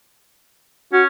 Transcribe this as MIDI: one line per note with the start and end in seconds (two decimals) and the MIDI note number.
0.93 1.07 61
0.93 1.03 66